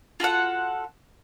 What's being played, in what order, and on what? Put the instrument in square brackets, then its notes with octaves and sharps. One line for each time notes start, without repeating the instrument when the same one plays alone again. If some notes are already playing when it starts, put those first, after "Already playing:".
[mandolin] F4 F#4 A4 F#5